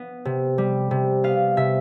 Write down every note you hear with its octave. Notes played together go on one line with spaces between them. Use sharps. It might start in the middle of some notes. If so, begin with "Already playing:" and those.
Already playing: B3
C3
G3
C3
B3 F5
C3 E5